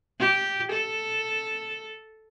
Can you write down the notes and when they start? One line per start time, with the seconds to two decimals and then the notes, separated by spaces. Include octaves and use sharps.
0.20 G4
0.73 A4